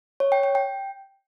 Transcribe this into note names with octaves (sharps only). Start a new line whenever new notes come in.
C#5
G5
G5
G5